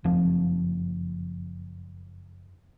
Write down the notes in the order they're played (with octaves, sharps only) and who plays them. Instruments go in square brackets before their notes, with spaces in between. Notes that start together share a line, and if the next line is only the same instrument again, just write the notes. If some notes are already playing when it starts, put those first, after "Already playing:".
[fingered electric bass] F#1 F2 F3